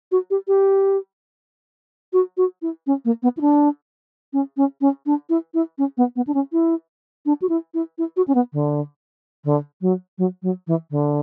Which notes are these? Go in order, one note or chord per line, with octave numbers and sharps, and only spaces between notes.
F#4
G4
G4
F#4
F#4
E4
C#4
A#3
B3
E4
D4
C#4
C#4
C#4
D4
E4
E4
C#4
B3
B3
D4
C#4
E4
D4
F#4
E4
E4
E4
F#4
C#4
B3
D3
D3
F#3
F#3
F#3
E3
D3